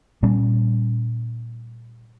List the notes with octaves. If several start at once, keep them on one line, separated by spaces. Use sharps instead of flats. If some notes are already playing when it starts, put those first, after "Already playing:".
A#2 G3 C#4